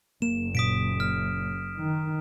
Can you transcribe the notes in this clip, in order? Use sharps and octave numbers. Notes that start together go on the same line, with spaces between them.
F#1 A#3 E7
A#2 D#6 B6 D7
F6
D#3